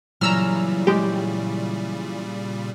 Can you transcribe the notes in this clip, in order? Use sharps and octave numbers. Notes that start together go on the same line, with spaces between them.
A#2 C#3 E3 F#3 G3 A#5 E6 F6
G#3 G4